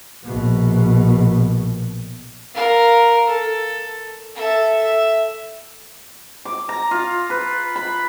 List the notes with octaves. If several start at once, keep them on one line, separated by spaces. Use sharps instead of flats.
A#1 B2
A#4 F5
A4
A4 E5
E5
D6
A#5
F4
B4
B5